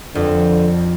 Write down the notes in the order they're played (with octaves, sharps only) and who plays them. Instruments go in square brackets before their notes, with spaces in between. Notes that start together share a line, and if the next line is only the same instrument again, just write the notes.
[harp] F2 [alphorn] D3